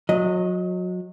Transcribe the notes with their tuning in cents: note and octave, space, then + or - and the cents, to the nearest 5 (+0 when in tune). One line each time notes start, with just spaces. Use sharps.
F#3 -30 D#5 +0